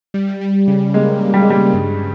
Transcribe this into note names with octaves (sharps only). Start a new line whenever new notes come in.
G3
G3
C#3
G#3 A#3
A#3
G3
G#3
C#3 G3
G2